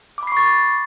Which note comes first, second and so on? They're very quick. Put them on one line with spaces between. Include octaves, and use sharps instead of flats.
D6 B5 C7 C#6 A6